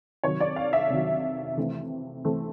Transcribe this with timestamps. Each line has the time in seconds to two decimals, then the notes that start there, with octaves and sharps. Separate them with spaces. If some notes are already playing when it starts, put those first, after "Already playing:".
0.24 C3 D#3 F#3 C#5
0.40 D5
0.56 F5
0.73 E5
0.90 C3 D#3 F#3
1.57 C3 E3 A3 C4
2.24 C3 E3 A3 C4